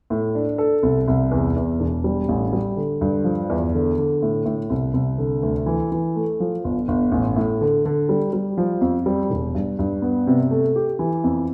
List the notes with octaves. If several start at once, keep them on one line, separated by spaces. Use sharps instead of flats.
A2
D4
A4
C2
C2
E2
E2
E1
G3
A1
G3
D3
G2
F3
E2
D3
D3
A2
A2
C2
C2
D3
D2
E3
E3
A3
F3
G1
G1
A1
A2
D3
D3
G3
G3
F3
F2
G3
E1
G2
G2
B3
C3
A3
G4
E3
F2